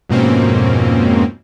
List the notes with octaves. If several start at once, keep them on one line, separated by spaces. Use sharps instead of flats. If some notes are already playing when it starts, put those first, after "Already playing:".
F2 G#2 B2 A#3 C4 C#4